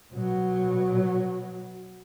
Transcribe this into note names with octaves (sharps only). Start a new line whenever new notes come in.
B2 F#3